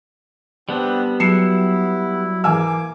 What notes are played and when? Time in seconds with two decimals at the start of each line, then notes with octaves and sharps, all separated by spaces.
0.69 G3 B3 C4 D4
1.20 F#3 E4 C7 C#7 E7
2.44 E3 A#3 G#5 D6 E6